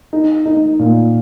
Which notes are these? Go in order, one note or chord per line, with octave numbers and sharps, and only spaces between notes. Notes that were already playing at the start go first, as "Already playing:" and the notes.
D#4
D#4
A#2